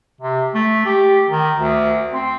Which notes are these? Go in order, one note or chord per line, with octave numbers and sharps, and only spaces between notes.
C3
A3
G4
D#3
D2
C4